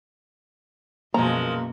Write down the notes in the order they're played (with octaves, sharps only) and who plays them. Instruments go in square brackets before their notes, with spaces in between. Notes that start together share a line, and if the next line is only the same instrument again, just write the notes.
[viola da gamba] F#2 B2 F#4 [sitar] F3 G#3 [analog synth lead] A#3 [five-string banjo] A#5